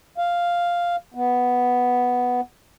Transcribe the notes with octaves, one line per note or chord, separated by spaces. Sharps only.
F5
B3